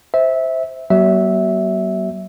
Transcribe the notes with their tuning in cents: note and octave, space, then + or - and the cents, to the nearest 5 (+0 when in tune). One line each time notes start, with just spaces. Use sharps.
C5 +0 E5 -15
F#3 +40 A#3 +40 E5 -10